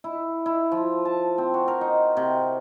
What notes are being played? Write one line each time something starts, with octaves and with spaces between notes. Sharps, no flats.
E4
E4
F3
A5
C4
F#4
A#4
D#4
C3